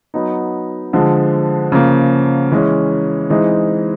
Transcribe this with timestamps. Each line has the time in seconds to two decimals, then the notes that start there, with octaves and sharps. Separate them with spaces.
0.14 F#3 B3 D#4
0.93 D3 F3 G#3
1.72 C#3 F3 A#3
2.52 E3 G#3 C#4
3.30 E3 G#3 C4 D#4